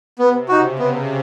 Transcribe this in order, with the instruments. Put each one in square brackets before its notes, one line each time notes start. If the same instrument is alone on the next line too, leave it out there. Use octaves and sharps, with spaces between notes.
[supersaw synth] C3 [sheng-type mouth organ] B3
[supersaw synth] C#3 [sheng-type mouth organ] D#4 F#4
[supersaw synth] C3 [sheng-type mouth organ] B3